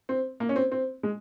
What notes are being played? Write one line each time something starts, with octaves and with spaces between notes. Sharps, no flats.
C4
A#3
C#4
C4
C4
G#3